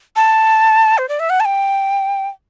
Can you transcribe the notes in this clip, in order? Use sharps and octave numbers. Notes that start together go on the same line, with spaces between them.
A5
C5
D5
E5
F#5
A5
G5